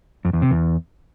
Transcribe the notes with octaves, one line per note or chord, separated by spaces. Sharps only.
F2
E2
C3
E2